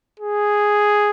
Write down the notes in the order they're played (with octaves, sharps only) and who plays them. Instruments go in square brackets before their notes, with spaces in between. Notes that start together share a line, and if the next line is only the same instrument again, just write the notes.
[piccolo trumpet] G#4